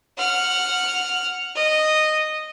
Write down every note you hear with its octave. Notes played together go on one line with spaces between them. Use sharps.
F#5 F6
D#5